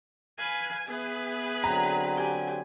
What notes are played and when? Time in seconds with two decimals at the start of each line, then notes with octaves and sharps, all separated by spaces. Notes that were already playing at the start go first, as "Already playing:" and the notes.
0.38 B4 F5 G#5
0.87 B3 G#4 B4 E5
1.64 D3 F#3 C4 A#5
2.16 G4 G#5